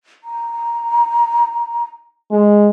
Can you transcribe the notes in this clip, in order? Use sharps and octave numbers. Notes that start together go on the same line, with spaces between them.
A#5
G#3